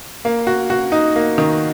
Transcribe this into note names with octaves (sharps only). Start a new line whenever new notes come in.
A#3
F#4
F#4
D#4
A#3
D#3